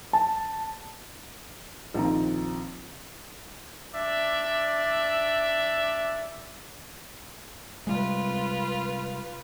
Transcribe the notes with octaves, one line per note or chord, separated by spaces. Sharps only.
A5
A#1 D#3 F3 C4 A#5
D4 D5 E5
C3 G3 G#3 F4 B4